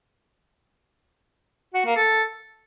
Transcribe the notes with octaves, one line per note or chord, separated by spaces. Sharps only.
F#4
A#3
A4